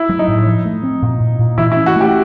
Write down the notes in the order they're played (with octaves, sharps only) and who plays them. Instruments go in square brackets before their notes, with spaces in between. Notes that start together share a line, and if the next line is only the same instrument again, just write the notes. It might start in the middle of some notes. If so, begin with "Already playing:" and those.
Already playing: [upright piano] E4
[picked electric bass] F#3
[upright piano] D#4
[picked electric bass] A2
F3
A3
C4
A#2
A#2
A#2
[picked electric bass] E3 [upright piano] E4
[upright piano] E4
[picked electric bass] C#4
[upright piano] F#4
[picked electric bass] A3 [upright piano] G4